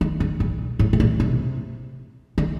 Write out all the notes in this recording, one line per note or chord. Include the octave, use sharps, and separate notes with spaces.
D#3
D3
A#2
A2
C3
A#2
C3
D3